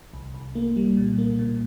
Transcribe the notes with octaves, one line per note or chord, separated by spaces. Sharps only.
C2
C2
A#3
G3
A#2
A#3
A#2